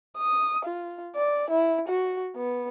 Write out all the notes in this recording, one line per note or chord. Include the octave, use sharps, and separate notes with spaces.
D#6
F4
D5
E4
F#4
B3